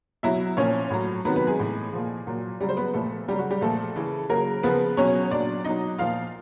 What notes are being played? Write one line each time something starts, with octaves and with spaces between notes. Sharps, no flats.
B2 F#3 E4 E5
A#2 F3 C#4 C#5
A2 F#3
C3 D#3 F#3 B3 B4
B3 B4
G#3 G#4
A2 E3
A#2 F3
A#2 F#3
C#3 F#3 G3 G4
C5
B3 B4
A#2 F3 A3 A4
C#3 F#3 G3 G4
F#4
G3 G4
A#2 F3 A3 A4
C#3 E3
C#3 F#3 A#3 A#4
C#3 F3 B3 B4
B2 F#3 C#4 C#5
A#2 F#3 D4 D5
B2 F#3 D#4 D#5
A#2 F3 F4 F5